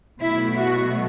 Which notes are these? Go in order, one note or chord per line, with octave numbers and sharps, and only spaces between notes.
B2 F#3 A3 E4
F#4